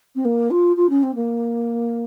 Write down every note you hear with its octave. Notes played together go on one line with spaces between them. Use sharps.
C4
A#3
F4
F4
C#4
C4
A#3